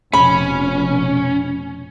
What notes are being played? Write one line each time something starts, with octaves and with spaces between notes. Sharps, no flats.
F1 B2 C#4 B5